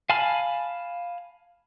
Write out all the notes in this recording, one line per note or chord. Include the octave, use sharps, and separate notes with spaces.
F5 G#5 A5 B5 F6